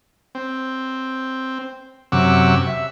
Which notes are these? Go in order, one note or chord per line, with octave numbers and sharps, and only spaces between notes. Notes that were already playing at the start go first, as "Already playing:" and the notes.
C4
F#2 C3 F#5 C#6 D6 E6
E5